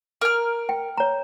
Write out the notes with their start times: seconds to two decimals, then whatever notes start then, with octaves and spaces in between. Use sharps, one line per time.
0.21 A#4 F6
0.69 G5
0.97 C#5 A#5